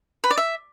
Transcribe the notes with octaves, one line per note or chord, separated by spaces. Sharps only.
B4
D5
E5